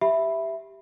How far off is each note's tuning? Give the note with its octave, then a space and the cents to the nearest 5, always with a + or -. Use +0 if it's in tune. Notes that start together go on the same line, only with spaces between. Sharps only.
G4 +0 E5 +0 B5 +0